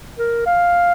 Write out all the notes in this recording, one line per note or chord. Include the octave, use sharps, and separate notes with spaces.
A#4
F5